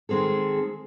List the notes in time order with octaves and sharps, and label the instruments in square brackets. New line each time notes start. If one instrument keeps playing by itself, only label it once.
[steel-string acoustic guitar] D#3 G#3 C4 G#4 A4